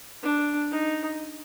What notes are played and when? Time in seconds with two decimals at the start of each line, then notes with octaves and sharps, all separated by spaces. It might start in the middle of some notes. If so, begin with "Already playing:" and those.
0.23 D4
0.71 D#4